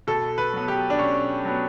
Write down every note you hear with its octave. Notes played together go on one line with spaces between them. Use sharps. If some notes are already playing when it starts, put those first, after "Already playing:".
B2 A4
B4
F#3 B3
G4
D4
B2 C#4
F#3 B3